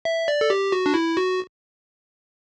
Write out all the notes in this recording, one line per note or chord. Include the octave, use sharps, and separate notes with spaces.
E5
D5
A4
G4
F#4
D4
E4
F#4